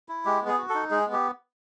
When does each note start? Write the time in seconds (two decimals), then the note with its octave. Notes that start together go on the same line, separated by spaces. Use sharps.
0.09 E4
0.25 G#3 G4
0.41 B3
0.47 G#4
0.58 F#4
0.69 A4
0.75 D#4
0.91 G#3 G#4
1.07 B3
1.13 G4